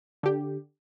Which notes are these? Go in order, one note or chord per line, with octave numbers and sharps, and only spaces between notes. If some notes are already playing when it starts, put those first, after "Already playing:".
D3 G4